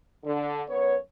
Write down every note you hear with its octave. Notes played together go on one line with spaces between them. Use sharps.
D3
F#2 B3 C#5